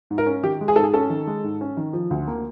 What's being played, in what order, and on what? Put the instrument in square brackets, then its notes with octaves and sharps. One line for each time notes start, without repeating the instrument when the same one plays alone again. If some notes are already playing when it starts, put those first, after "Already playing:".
[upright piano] G#2
A#4
C#4
D#3 G4
G#3
G#4
G#2 A4
G#4
C#4 A4
D#3
G#3
G#2
C#4
D#3
F3
D2
A#3